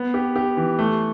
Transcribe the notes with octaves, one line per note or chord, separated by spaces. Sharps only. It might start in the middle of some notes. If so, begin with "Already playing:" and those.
Already playing: B3
G4
G4
E3
A3